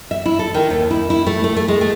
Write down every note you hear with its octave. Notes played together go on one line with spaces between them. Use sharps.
E5
E4
A4
D#3
D#2
E4
E4
A3
A3
A3
G#3
A3